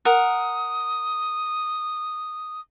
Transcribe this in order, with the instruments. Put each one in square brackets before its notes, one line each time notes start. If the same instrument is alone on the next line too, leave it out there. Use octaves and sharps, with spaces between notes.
[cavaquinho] A#4 F#5 [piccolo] D#6